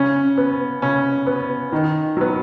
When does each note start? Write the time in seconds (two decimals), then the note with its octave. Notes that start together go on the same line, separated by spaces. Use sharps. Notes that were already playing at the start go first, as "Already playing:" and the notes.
Already playing: C#3 C#4
0.38 B3
0.82 C#3 C#4
1.27 B3
1.73 D#3
2.17 F#3 B3